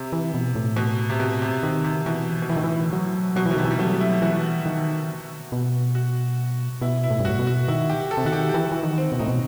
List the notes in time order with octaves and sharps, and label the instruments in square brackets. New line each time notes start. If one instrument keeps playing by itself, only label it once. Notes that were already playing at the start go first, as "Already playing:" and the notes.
Already playing: [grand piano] C3
[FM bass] E3
B2
A2
[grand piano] B2
C3
B2
C3
[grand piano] C3 [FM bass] D#3
[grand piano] C3
[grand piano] B2 [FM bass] E3
[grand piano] B2
[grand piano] A2 [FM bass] E3
[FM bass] D#3
E3
F#3
[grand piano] B2 [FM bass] F#3
[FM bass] E3
[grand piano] B2
[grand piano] C3 [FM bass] D#3
[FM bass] E3
[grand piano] G3
[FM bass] F#3 [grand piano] A3
[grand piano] E4
[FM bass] E3 [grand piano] F#4
[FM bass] D#3
B2
[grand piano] F#4
[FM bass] B2 [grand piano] E4
[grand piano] E4
[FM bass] A2
G2
[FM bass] A2 [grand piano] F#4
[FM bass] B2
[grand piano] F#4
[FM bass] D#3 [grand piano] E4
[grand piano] G4
A4
[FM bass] C3
[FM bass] D#3 [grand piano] F#4
[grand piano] G4
G4
[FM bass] E3 [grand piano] F#4
[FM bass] E3
D#3
[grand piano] C4
[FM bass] B2
[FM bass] A2 [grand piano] D#4
[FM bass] B2